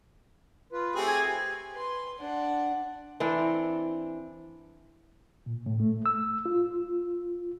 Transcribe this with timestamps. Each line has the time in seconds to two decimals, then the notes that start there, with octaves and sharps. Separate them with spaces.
0.73 F4 B4
0.96 A3 C4 G4 G#4
1.08 G#5
1.73 B4 C6
2.19 D4 F#5
3.20 E3 C4 D4
5.46 A#2
5.66 A2
5.80 A3
6.06 E6
6.46 F4